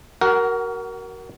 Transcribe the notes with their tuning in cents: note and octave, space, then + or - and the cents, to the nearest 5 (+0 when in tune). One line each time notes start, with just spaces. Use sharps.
F#4 +35 A#4 +0 F#5 +10